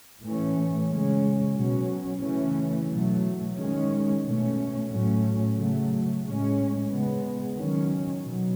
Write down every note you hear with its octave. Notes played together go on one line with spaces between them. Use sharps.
A2 E3 A3 C#4
C#3 G#3 C#4
B2 F#3 C#4
C#3 E3 A3 C#4
B2 F#3 A3
D#3 G#3 C#4
B2 A3 C#4
A2 F#3 A3 C#4
C#3 F#3 A3
A2 G#3 C#4
C#3 G#3 B3
D#3 F#3 C#4
B2 F#3